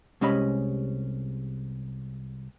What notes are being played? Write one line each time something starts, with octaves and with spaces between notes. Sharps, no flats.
C2 G#3 C#4 G4 D#5 B5